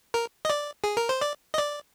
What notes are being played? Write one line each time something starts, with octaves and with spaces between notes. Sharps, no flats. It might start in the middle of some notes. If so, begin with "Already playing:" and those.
A#4
D#5
D5
G#4
A#4
C5
D5
D#5
D5